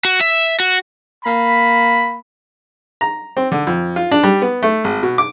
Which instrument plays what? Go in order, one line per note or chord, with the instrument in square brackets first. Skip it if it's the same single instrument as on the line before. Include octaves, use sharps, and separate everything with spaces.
[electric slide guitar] F#4
E5
F#4
[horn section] A#3 B5
[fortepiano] A#5
C4
D3
F2
F4
D4
G3
B3
A3
G#1
B2
D6